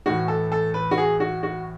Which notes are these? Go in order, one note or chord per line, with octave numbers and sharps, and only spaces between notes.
A2 E3 F#4
A4
A4
B4
F#4
G#4
F#4
F#4